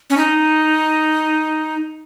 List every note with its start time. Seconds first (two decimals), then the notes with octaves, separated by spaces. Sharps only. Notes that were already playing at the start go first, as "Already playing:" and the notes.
0.10 C#4
0.17 D#4